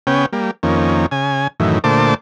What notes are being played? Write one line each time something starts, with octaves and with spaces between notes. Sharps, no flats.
C#3 B3 C#4 G5
G3 A#3
F2 D#3 A#3 C#4
C#3 G#5
F#2 A2 D#3 E3
A#2 D3 A3 C5 A5 D6